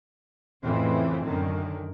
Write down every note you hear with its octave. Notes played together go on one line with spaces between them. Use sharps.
F2 A2 C#3 E3 C4
F#2 D3 D#3